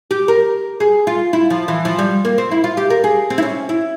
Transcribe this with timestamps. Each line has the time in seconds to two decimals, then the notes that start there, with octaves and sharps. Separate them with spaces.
0.11 G4
0.28 A#4
0.80 G#4
1.07 F4
1.33 E4
1.50 F3
1.68 E3
1.85 F3
1.99 G3
2.25 A#3
2.38 C4
2.51 E4
2.64 F4
2.77 G4
2.90 A#4
3.04 G#4
3.30 C4
3.38 E4
3.42 C#4
3.69 E4